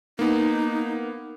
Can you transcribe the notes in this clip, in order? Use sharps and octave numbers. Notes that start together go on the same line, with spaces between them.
A#3 B3 D#4